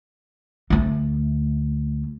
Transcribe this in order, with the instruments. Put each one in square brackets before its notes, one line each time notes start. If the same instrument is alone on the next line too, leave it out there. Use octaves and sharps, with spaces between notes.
[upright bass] D2 A3